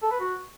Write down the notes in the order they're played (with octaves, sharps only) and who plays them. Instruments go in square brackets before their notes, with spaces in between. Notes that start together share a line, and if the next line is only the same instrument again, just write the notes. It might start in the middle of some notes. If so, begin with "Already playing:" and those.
[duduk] A4
B4
F#4